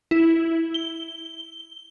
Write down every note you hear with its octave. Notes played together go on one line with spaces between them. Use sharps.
E4
G7